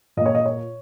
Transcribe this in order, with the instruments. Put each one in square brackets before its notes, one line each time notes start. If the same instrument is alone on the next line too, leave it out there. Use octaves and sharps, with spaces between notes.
[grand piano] A#2 A#3 D#5
C#5
D#5
C#5